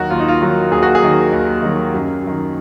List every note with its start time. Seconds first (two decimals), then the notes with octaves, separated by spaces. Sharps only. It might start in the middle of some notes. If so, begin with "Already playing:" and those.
Already playing: D#2 D#3 F#3 F#4 A#4
0.10 D#2 F4
0.20 D#4
0.28 F4
0.41 D#3 F#3
0.71 D#2 G#4
0.82 F#4
0.95 G#4
1.02 D#3 F#3
1.33 D#2
1.62 D#3 F#3
1.94 F#2
2.24 D#3 F#3